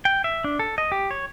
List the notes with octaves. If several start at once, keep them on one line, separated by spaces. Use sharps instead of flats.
G5
E5
D4
A4
D#5
G4
C#5